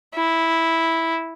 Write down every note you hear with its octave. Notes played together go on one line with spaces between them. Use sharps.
E4